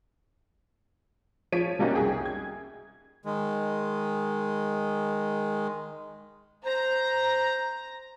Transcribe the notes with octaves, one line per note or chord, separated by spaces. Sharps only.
F3 C#5 B6 D7 D#7
B2 G3 A#3 C#4 D#4 F#4
C2 G#4 G5
G#6
D#3 G#3
C5 A#5